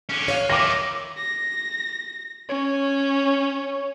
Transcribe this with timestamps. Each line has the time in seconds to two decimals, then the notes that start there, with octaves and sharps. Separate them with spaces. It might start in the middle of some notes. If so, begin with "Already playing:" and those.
0.09 D3 C#4
0.28 C#5 F5
0.50 D#3 E4 D6 A#6
1.17 A#6
2.49 C#4 C#5